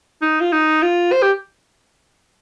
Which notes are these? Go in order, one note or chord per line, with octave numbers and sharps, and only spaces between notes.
D#4
F4
D#4
F4
C5
G4